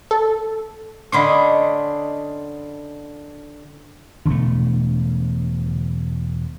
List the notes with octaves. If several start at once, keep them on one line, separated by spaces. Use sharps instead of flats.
A4
D3 C#4 D4 D#5 B5 C6
E1 B2 D3 A3